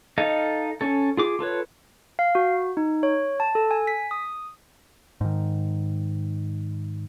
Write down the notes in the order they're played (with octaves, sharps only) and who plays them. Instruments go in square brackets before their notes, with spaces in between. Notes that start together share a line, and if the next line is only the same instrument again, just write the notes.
[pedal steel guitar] D#4 A4 D#5 F5
C#4 A4
F4 G#4 D6
F4 A4 B4 C#5
[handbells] F5
F#4
D#4
C#5
A5
A4
G#5
B6
D#6
[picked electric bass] G#2 D#3